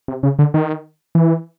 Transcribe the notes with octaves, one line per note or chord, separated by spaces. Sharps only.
C3
C#3
D3
D#3
E3